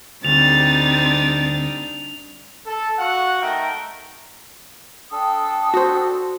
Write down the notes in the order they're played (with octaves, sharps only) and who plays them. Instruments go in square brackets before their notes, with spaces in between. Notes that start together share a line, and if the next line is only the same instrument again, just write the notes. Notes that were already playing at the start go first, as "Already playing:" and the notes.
[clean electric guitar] D2 [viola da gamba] G3 D4 D#4 [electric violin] C4 A6 [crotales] F7
[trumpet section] A4
F#4 F5 F#5
A3 D#4 A#4 E5 G5
[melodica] D4 A4 [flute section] G5 D#6
[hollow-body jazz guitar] F#4 C5